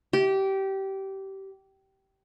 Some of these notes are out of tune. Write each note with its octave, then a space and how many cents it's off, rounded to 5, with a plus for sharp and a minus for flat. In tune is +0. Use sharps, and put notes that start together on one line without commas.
G4 -20